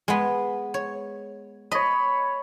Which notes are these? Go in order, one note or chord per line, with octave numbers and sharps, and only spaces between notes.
G#3 B3
C#5
C#5 D#5 B5